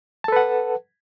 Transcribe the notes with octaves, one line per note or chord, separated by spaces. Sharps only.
A4 B4 F#5 A5